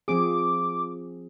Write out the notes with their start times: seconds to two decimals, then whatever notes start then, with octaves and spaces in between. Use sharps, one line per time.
0.08 F3 C4 G#4 D6